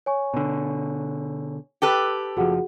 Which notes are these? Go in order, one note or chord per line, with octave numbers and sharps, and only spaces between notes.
C#5 G#5 C#6
B2 D3
G4 A4 B4
F#1 F3 F#4 G#4 F#5